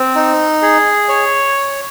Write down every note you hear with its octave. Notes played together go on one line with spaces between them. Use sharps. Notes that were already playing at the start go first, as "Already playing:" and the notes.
Already playing: C4
D#4
G#4
C#5